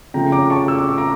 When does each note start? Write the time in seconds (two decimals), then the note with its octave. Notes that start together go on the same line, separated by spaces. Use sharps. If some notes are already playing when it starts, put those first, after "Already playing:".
0.14 C#3 F3 A3 G5 A#5
0.32 A#5 D6
0.50 A5 C#6
0.68 E6
0.78 D6
0.88 C#6
0.98 A#5 D6